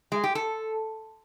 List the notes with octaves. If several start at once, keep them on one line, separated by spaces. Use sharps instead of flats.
G#3
G4
A4